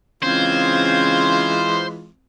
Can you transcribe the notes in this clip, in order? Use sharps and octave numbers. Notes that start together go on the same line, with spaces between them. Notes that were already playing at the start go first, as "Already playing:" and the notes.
C#3 E3 G#3 C4 F4 C5 G#6